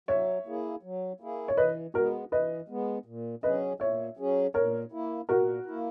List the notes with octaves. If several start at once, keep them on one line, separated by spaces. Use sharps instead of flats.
F#3 C#5 E5
A#3 E4 G#4
F#3
A#3 E4 G#4
C#5
E3 B4 D#5
G#3 B3 F#4 A#4
E3 B4 D#5
G#3 B3
A#2
F#3 C#4 G#4 B4 D#5
A#2 C#5 E5
F#3 C#4 G#4
A#2 A#4 C#5
A#3 E4
A#2 F#4 A#4
A#3 E4